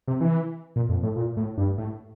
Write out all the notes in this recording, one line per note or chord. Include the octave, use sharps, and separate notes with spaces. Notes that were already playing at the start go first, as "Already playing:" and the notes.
C3
E3
A#2
F2
A2
A#2
A2
G2
A2